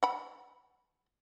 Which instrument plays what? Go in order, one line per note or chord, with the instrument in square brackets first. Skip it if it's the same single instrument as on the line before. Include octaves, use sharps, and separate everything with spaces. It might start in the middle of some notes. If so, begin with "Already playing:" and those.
[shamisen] F#5 B5